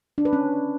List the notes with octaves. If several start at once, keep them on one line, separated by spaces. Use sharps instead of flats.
D4
B4
C#4